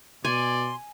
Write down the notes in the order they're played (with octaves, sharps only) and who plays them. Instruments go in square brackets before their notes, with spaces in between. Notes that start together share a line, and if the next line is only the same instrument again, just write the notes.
[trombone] B2 [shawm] D5 [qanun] G#5 [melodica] C6